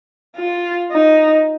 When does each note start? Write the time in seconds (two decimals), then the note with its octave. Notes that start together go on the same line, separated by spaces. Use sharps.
0.36 F4
0.92 D#4